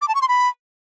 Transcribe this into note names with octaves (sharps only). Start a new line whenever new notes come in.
D6
A5
C#6
C6
B5